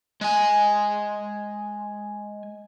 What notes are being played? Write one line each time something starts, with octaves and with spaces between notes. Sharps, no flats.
G#3 G#5